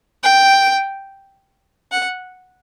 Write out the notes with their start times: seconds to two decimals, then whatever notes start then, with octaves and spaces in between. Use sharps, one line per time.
0.23 G5
1.91 F#5